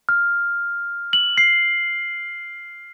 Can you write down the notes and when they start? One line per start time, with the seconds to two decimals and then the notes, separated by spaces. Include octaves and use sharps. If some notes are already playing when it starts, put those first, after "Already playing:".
0.09 F6
1.13 F#7
1.38 C7